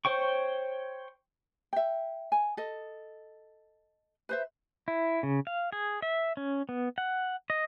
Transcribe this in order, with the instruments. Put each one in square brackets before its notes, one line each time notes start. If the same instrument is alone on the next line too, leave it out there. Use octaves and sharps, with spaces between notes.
[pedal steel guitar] C5 C#5 G5 C#6
[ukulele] E5 G5
G#5
A4 D#5
B4 C5 E5
[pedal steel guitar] E4
C#3
F5
G#4
E5
C#4
B3
F#5
D#5